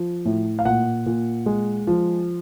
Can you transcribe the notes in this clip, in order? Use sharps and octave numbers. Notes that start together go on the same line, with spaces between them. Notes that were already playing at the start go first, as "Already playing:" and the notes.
Already playing: F3
A2
F5
A#2 F#5
A#2
G#3
F3